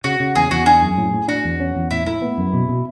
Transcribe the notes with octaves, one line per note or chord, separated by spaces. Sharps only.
C#3 F#4
C#3
E2 G#4
E2 F#4
D4 G#4
F#2
A2
A2
D4 F#4
E2
C#4
E2
A2 E4
A2 E4
B3
F#2
B2
B2